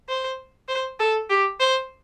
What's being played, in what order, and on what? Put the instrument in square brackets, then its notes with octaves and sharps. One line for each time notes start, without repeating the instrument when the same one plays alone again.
[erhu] C5
C5
A4
G4
C5